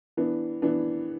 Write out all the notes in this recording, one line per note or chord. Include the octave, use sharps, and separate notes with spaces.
E3 B3 D4
E3 B3 D4